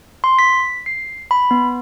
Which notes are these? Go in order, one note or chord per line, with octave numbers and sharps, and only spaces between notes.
C6
B6
C7
B5
B3